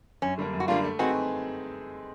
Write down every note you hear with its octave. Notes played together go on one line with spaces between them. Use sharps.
F#2 C#4
D3 G3 A#3 D4
F#2
F#4
D3 G3 A#3 D4 F4
A3
C4 D#4 F#4 G#4 B4